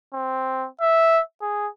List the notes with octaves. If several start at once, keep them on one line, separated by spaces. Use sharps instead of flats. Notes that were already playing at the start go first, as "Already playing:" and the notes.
C4
E5
G#4